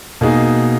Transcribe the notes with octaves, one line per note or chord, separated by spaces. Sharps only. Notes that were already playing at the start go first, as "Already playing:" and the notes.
B2 A#3 D#4 G#4